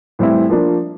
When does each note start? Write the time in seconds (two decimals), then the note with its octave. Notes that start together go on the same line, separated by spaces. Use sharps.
0.19 A2 E3 G3 C4 E4
0.50 F3 A#3 D4